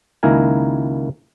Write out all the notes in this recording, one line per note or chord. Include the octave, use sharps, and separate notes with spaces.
C#2 D#3 A#3 E4 A#4 G#5